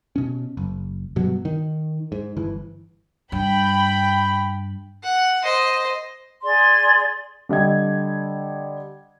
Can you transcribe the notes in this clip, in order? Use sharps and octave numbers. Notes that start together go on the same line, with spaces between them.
B2 C#4
F#1
G2 B2 F#3
D#3
G#2
G1 E3
G2 G5 B5
F#5
C5 D#5
G#4 D5 C6
D3 G3 D#5 G#6